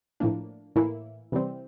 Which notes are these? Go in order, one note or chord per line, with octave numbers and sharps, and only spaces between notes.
A2 F3 A#3 D4
A2 E3 A#3 E4
C3 E3 G3 C4